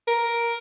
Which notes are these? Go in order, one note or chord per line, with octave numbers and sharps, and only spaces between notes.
A#4